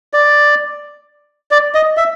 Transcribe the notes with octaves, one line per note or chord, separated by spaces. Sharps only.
D5
D5
D#5
E5